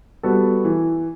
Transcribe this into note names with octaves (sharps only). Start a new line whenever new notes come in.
G3 B3 F#4 A4
E3